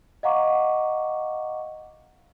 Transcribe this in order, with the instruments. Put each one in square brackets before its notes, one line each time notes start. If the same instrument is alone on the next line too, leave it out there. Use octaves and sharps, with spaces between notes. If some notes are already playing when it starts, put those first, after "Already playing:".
[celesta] D#5 F5 F#5 A#5 C#6 D6